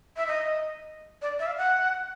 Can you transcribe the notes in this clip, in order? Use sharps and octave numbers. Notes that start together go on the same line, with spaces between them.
E5
D#5
D5
E5
F5
F#5